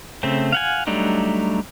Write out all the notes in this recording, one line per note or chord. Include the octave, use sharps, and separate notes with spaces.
C#3 A3 C4
F5 F#5 G#5
F#3 G3 A3 D4 D#4